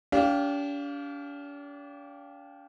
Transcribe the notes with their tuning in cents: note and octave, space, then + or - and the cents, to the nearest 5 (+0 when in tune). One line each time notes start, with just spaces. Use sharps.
D4 -45 G4 +0 F5 +0